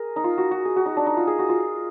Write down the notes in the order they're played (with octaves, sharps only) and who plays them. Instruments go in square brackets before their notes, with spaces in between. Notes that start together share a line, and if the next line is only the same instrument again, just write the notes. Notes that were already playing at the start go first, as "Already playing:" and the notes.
Already playing: [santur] G#4 A#4
D#4
F4
F#4
F#4
G#4
F#4
D#4
D4
D#4
F4
G#4
F#4
F4